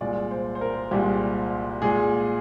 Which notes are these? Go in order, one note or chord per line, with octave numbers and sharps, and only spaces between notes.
C2 A#2 G#3 D5
C5
C5
A#4
C2 A#2 G#3 G4
A#2 G#3 G#4